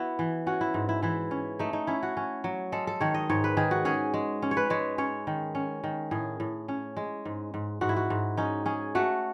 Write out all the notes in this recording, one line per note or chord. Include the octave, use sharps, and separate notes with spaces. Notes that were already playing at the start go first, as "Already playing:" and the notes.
Already playing: B3 E4 F#4
E3
C#4 F#4
E4
G#2
E4
E3 E4
C#4
A3 D#4
D#4
C#4 E4
F#4
C#4
F#3
G#3 A4
A4
D#3 C#5
D#5
G#2 C#5
B4
D#3 G#4
F#4
C#4 G#4
G#3
C#4
C#5
B4
G#3 C#5
C#4 C#5
D#3
C#4
D#3
A2 G#4
A2
C#4
G#3
G#2
G#2
G#2 F#4
E4
F#4
G#2
C#4 D#4
C#4 G#4
A3 F#4